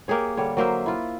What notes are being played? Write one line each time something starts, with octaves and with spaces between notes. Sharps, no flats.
A#3 G4 G#4 C#5
D3 G3 C#5
F#3 A#3 C5 E5
E4 F4